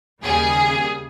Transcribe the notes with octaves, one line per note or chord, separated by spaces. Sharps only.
D#2 C#3 G3 G#4